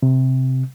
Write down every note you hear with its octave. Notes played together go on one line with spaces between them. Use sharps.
C3